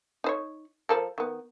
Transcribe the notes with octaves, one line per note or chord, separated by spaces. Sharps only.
D#4 C5 C#5
F3 A4 A#4
D#3 B3